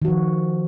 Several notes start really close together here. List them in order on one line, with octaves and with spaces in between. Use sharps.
D#3 F#4 F3